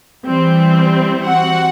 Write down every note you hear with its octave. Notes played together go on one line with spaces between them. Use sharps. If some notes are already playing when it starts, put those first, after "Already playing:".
E3 G3 C4
F#4 F#5